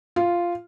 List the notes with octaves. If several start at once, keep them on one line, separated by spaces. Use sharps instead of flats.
F4